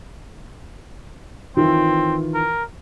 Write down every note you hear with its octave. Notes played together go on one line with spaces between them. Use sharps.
D#3 E3 C4 F4
A#4